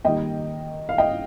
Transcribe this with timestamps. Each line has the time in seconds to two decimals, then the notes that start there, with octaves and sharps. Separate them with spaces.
0.05 D#3 G3 A#3 D#5 G5
0.89 F5
0.98 D#5 G5